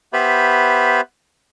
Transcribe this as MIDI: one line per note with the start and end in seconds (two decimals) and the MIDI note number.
0.13 1.01 59
0.13 1.01 67
0.13 1.01 71
0.13 1.01 72
0.13 1.01 76
0.13 1.01 83